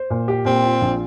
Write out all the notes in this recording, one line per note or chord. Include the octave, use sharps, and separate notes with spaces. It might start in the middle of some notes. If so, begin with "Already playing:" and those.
Already playing: C5
A#2
G4
A#2 C4
F4
A#1